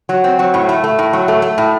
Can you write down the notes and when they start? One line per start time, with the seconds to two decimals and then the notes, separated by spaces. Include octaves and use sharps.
0.09 F#3
0.24 C4
0.39 F#3
0.54 A2
0.69 A3
0.84 A3
0.99 A2
1.13 F#3
1.28 A3
1.42 A3
1.58 A2